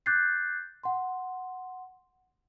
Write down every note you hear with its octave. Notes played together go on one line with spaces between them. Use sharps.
D6 F#6 G6 A6 C7
F#5 C6